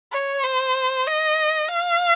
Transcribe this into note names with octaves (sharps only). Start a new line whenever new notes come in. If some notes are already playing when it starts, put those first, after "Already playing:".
C#5
C5
D#5
F5